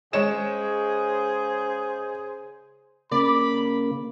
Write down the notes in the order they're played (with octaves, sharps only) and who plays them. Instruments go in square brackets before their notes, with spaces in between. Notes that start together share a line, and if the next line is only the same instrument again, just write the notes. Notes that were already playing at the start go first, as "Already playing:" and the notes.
[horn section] C#3 G#4 C5 [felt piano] G#3 C#5 E7
[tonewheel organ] C#3 A#3 [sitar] D5 [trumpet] B5